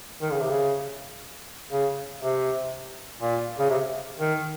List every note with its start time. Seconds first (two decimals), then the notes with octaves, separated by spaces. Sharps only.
0.22 D#3
0.32 C#3
0.41 C3
0.50 C#3
1.72 C#3
2.21 C3
3.21 A#2
3.59 C#3
3.70 C3
4.19 D#3